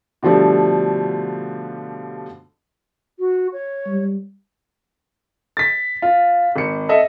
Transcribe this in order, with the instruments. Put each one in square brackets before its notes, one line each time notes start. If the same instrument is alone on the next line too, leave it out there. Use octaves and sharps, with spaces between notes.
[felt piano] B2 D3 F3 G3 A3
[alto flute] F#4
C#5
[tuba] G3
[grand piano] A6 B6
F4
G#1 C#7
A4 D#5 E5